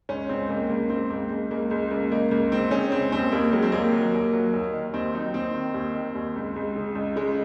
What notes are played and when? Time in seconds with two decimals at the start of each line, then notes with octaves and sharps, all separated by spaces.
0.09 C#2 C#4
0.29 C#2 C4
0.49 C#2 A#3
0.70 C#2 A#3
0.89 C#2 C4
1.10 C#2 A#3
1.30 C#2
1.51 C#2 A#3
1.70 C#2 G#3
1.91 C#2 A#3
2.12 C#2 A#3
2.31 C#2 A#3
2.52 C#2 C4
2.71 C#3 C#4
2.92 C#2 C4
3.12 D#2 C4
3.32 D#2 A#3
3.52 F#3 G#3
3.63 C4
3.72 D#2 A#3
3.93 F#3
4.13 D#2
4.33 F#3
4.53 D#2
4.73 D#3
4.93 D#2 C4
5.14 F#3 D#4
5.34 D#2 C4
5.54 D#3
5.74 D#2
5.95 D#3
6.15 D#2
6.36 C#2
6.56 C#2
6.76 C#3
6.95 C#2
7.16 C#3 G#3